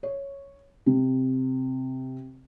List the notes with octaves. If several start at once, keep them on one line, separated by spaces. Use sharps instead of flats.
C#5
C3